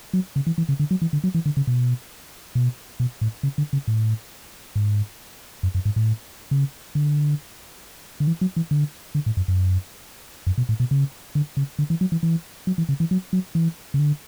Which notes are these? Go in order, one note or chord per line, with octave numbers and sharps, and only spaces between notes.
F#3
C#3
E3
E3
C#3
D3
F#3
E3
D3
F#3
E3
D3
C#3
B2
B2
B2
A2
C#3
D3
C#3
A2
G#2
F#2
F#2
G#2
A2
C#3
D3
D3
E3
F#3
E3
D3
D3
A2
F#2
F#2
F#2
B2
A2
B2
C#3
D3
C#3
D3
E3
F#3
E3
E3
F#3
E3
C#3
E3
F#3
F#3
E3
C#3
D3